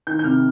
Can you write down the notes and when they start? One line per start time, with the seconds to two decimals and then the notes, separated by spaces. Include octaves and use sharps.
0.07 D#3 G6
0.19 G6
0.24 C3 F6